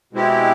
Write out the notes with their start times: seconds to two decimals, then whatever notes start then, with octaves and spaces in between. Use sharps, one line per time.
0.13 B2 G#3 C4 E4 G4